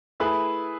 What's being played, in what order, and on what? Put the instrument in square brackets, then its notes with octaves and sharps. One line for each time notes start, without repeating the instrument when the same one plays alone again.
[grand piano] A3 E4 G#4 B4